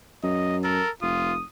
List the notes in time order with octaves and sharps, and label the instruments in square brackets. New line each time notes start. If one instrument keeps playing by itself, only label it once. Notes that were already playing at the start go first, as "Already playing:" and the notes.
[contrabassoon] F#2 [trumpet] D#5
[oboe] A4 [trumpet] A#4
[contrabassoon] F1 [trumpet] F4 [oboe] D#6